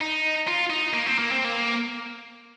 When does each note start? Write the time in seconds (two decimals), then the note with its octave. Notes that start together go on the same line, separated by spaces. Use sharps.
0.01 D#4
0.47 F4
0.70 D#4
0.94 A#3
1.06 C4
1.19 A#3
1.32 C4
1.45 A#3